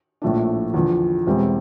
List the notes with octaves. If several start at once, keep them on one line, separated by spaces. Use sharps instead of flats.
A#1 A2 F3 A3 D4
E2 D3 F3
E1 E2 E3 G3 C4